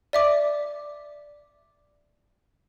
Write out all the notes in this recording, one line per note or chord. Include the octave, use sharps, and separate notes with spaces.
D5 E5 D6